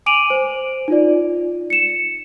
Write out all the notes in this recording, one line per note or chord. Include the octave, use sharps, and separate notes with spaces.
G#5 D6 D7 D#7 F7 F#7
C5
D#4 F4 D5
C#7 E7